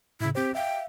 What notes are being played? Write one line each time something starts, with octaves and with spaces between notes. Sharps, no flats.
A2 C#3 E4
C4 G4 C5
E5 F5 G5